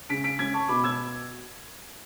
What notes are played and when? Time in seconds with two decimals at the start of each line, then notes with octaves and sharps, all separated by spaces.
0.09 C#3 B6 D7
0.24 B6 D7
0.39 C#4 G#6 B6
0.54 A5 C#6
0.68 B2 B5 D6
0.84 E6 G#6